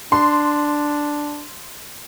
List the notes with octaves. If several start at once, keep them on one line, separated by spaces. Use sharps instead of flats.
D4 C6